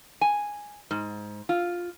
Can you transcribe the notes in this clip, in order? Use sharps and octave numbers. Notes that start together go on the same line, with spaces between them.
G#5
G#2
F4